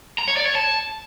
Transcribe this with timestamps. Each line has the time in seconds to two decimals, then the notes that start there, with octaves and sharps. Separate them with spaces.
0.18 A#5
0.28 C#5
0.37 D5
0.46 C#5
0.55 A5